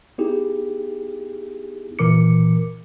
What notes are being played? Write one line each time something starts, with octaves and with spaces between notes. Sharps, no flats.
B3 D#4 E4 G4 G#4
A#2 E3 A#4 D6 C#7